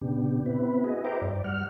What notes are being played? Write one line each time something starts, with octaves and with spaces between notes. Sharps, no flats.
A#2 C#3 B3 D4 G4
B3 C4 E4 B4
E4 F#4 G#4 D#5
B4 C5 E5 G5 A#5 D6
G2 D5
G3 F#5 F6